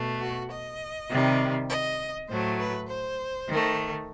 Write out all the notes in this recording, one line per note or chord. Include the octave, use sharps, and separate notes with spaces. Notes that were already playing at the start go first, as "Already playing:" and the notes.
Already playing: B2 A3
F#4
D#5
C3 D#3 G3
D#5
A2 F#3 A3 C5
B4
C5
D#3 A3